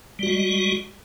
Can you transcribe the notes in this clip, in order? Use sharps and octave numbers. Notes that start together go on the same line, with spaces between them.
G3 G#3 F#4